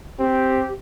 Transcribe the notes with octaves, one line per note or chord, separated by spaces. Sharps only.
C4 G4